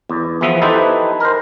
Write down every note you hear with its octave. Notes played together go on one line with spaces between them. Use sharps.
E2
E3 F3 B3 E5
D#4 E4 G4 A4 B4 C5
A#4 C5